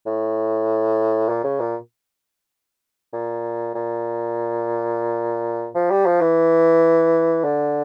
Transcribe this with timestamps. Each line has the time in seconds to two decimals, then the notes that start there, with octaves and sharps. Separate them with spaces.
0.06 A2
1.29 A#2
1.44 C#3
1.60 A#2
3.13 A#2
3.75 A#2
5.75 F3
5.90 G3
6.06 F3
6.21 E3
7.44 D3